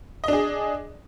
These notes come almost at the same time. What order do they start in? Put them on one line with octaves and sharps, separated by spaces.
D#5 D4 G#4